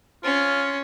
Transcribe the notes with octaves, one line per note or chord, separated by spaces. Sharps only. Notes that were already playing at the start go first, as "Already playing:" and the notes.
C#4 F4